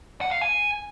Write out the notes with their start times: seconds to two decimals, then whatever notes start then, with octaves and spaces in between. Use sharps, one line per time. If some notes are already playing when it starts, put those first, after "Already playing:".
0.21 F#5
0.31 F5
0.41 G#5